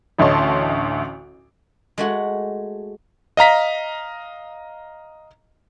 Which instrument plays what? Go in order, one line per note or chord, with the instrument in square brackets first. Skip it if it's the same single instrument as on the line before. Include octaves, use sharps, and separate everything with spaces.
[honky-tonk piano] A1 D2 C#5 D#5 A5 C6
[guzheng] G#3 A3 F#4
[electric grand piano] D#5 F5 A#5 B6